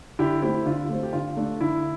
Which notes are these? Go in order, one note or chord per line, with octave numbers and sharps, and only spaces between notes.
D3 E4 G4
A3 C4 E4 G4
D3 F4
A3 C4
G4
D3 F4
A3 D4
D3 E4